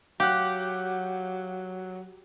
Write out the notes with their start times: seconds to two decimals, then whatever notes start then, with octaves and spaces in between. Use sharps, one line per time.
0.20 F#3 G4 F5 F#5 F#6